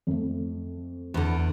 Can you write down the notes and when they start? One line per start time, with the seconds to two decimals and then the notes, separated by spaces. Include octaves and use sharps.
0.07 F2 A3
1.14 E2 D3